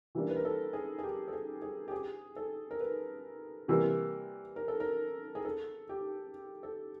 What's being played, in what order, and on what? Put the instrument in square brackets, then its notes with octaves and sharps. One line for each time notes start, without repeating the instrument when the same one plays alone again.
[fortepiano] E3 G3 A#3 D4
[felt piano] B4
A#4
A4
G#4
G#4
G4
A4
G#4
G#4
G4
G#4
A4
A#4
B4
[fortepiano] C3 E3 G3 A#3
[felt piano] A#4
A4
A#4
G#4
A4
G4
A4